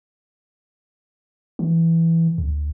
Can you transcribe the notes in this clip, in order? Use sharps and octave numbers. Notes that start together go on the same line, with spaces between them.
E3
D2